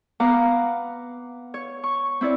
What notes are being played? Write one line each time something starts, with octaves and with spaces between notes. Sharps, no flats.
B3 F5 F#5 A#5 D6
C#5
C#6
C4 E4 C#5 D5